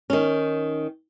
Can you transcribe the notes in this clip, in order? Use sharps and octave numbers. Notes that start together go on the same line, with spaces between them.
D#3 C#4